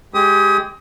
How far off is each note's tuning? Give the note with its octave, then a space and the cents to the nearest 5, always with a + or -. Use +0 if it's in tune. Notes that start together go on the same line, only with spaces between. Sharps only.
G#3 -5 G4 +0 D#6 +30